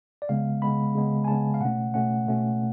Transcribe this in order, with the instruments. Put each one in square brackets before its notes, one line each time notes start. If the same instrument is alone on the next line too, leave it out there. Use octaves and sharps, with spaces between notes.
[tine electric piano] D5
C#3 G#3 B3 F5
C#3 G#3 B3 B5
C#3 G#3 B3
G#5
C#3 G#3 B3 A5
F5
B2 A3 C#4 F#5
B2 A3 C#4 F#5
B2 A3 C#4